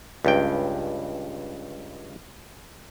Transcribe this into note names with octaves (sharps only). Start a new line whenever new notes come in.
C#2 G2 G5